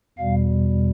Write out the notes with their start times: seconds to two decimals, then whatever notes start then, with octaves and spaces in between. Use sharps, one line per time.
0.18 E2 B2 G3 F5